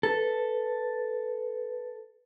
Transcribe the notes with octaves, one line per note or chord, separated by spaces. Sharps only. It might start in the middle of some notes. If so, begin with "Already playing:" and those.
A4 B4